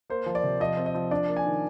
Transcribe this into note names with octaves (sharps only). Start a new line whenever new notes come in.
A#3 C5
F3
D5
C3
F3 D#5
C4
D#5
F3
D4 D5
A#3
G#5
D#3